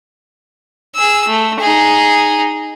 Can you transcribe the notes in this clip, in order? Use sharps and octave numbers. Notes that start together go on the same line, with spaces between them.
G#4 E6
A3
D#4 G#4